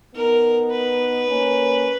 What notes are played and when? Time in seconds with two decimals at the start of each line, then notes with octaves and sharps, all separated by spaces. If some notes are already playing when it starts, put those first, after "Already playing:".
0.15 B3 D#4 A#4
0.71 B4
1.27 A#3 C#4